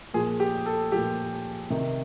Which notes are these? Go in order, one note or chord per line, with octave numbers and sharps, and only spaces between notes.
A#2 F3 G#4
G4
A4
A#2 F3 G4
C3 D#3